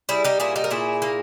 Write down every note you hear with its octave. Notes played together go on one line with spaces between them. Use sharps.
G3 E4 G#4
D#4 G4
A#2 E4 G#4
D#4 G4
A#4
A#2 E4 G#4
A#3